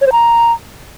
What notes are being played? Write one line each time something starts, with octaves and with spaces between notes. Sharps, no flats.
C#5
C5
A#5